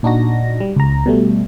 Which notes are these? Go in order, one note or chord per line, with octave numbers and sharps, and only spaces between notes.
A#2 D4 D#4 F#4 A#6
G3
C#2 A#5
B2 G3 A3